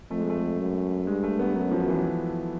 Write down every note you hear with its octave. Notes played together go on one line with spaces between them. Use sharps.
F2 A3
G#3
A3
F#2
G2 G#3
A3
B3
F#2 F#3
F3
E3